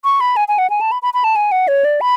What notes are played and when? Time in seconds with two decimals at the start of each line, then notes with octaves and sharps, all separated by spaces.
0.04 C#6
0.21 B5
0.37 G#5
0.48 G#5
0.58 F#5
0.70 G#5
0.81 A5
0.92 B5
1.02 B5
1.14 B5
1.24 A5
1.36 G#5
1.52 F#5
1.68 C#5
1.85 D5
2.01 B5